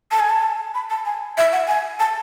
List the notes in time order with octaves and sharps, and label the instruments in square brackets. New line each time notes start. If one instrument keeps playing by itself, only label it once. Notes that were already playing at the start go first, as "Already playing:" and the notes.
[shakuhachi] A5
G#5
A5
B5
A5
G#5
E5
F#5
G#5
A5